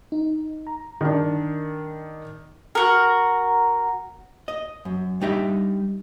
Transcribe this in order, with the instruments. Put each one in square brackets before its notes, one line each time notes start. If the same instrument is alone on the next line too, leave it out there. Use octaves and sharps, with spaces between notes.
[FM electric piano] D#4
A#5
[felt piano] D#3 D4
[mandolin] F#4 A#4
[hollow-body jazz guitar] D#5
F#2
G3 D4 D#4 G4 D#5 E5